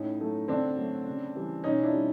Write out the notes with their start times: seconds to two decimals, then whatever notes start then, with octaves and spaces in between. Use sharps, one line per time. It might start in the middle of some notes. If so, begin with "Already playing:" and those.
Already playing: A2 C#4 D#4
0.19 F#3 A3
0.48 D3 C4 D4
0.77 F#3 A3
1.06 C#3
1.35 E3 G3
1.64 B2 C#4 D#4
1.83 D4 E4
1.93 G3